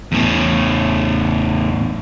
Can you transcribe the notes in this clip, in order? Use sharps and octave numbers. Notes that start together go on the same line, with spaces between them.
E2 A2